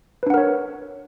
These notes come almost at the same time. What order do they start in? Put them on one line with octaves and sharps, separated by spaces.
B4 D4 F#5 A#4 C#5